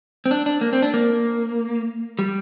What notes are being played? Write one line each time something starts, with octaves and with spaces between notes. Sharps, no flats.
C4
D4
D4
A#3
C4
D4
A#3
G3